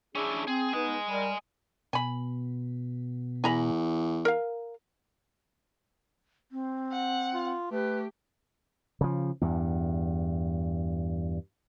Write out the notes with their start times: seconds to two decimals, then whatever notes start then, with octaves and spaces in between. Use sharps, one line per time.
0.15 C#4 D4 E4 G#4
0.47 C4 G#4
0.73 B3 D#4 B4 D#5 G#5
1.09 G3 A#4
1.93 B2 G#5 B5
3.44 E2 G#5 A#5 B5
4.25 A#4 F5
6.52 C4
6.92 F#5
7.34 F4
7.71 A3 G4 B4
9.01 C#3 F3
9.41 E2 G2